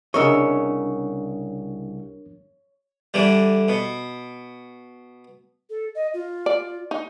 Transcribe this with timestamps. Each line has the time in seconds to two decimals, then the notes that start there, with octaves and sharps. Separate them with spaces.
0.14 C2 C#3 D4 A#4 C#5 D#5 C#6 E6
3.14 D3 E3 G3
3.68 B2
5.70 A4
5.95 D#5
6.14 F4
6.46 D5
6.91 D#4